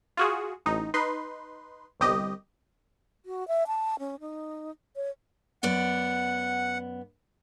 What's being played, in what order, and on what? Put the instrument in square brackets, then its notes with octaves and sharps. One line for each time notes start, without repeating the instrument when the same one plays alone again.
[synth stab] F4 F#4 G#4
A1 D#4
D#4 B4 C6
G1 C2 G4 D#5
[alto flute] F#4
E5
A5
C#4
D#4
C#5
[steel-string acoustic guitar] F#2 B3 D5 [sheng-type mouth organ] F#5